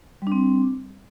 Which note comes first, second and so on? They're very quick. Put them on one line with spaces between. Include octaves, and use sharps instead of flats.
G3 D4 C4